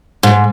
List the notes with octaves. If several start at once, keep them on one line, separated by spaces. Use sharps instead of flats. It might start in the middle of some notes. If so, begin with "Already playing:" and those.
G#2